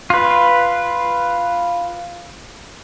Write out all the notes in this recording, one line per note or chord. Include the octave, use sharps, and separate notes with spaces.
F4 B4